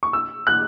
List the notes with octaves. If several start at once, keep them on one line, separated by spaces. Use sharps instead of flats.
C#6
E6
F#6